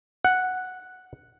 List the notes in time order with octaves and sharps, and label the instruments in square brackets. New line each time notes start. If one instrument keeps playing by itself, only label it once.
[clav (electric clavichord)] F#5